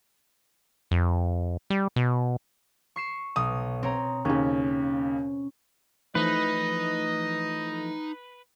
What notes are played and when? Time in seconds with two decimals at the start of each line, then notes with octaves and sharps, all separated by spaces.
0.91 F2
1.70 G3
1.96 B2
2.96 C#6 C7 E7
3.36 B1 D#6
3.83 C4 C#5 A#5
4.25 D#2 C#3 C#4
6.15 E3 F3 A3 D#4 B4 D#5